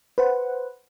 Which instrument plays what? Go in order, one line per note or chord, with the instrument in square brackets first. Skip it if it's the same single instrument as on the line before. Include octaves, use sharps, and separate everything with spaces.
[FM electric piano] B4 C5 F#5